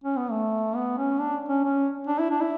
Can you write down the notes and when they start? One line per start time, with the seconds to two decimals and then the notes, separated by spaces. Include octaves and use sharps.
0.04 C#4
0.17 B3
0.31 A3
0.76 B3
0.98 C#4
1.20 D4
1.49 C#4
1.64 C#4
2.07 D4
2.19 E4
2.30 D4
2.42 E4